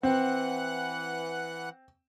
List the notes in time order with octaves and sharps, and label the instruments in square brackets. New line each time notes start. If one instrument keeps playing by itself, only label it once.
[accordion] E3 F#5 F#6 [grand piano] C4